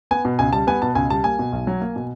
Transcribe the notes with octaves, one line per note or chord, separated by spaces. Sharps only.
B3 G#5
B2
C#2 G#5
G3 A5
B3 G#5
B2 A5
C#2 G#5
G3 A5
A#3 G#5
B2
B1
F#3
A#3
B2